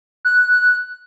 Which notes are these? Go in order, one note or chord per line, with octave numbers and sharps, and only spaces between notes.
F#6